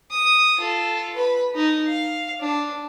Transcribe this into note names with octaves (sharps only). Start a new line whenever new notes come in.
D#6
F4 A4
B4 B5
D#4
F5
D4